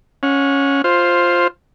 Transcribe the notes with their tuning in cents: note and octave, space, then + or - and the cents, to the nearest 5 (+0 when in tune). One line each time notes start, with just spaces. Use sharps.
C#4 +0 F#5 -35
F4 +0 C5 +10